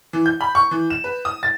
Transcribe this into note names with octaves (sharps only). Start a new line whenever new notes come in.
E3
G6
B5
C#6
E3
E7
B4
D#6
A6